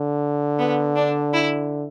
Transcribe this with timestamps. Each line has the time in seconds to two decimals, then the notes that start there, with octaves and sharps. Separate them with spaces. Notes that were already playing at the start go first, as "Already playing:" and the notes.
Already playing: D3
0.59 B3
0.96 D4
1.34 E4